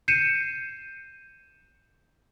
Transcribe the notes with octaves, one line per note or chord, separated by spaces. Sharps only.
G6 C7 C#7 D#7 E7